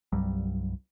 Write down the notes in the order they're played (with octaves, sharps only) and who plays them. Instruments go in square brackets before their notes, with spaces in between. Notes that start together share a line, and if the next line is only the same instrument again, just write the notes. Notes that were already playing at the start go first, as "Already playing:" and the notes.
[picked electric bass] C2 G2 F#3 G3